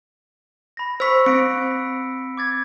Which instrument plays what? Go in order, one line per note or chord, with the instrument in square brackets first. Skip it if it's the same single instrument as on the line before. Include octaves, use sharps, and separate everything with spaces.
[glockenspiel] B5 A#6
[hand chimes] C5 C#6 [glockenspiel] E6 B6
[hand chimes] C4 [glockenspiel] C#7 D7
[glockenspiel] D6 G#6 A6